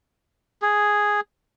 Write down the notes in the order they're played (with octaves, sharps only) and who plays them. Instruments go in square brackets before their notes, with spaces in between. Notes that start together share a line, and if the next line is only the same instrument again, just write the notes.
[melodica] G#4